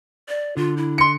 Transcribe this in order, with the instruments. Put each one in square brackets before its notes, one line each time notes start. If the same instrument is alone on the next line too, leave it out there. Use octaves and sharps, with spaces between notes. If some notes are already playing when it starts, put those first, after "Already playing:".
[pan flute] D5
[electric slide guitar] D3 [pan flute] F4
[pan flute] E4
[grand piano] C6 C#7